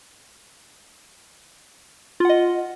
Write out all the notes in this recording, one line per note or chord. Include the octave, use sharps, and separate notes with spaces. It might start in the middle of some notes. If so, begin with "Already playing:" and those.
F4 D#5 F#5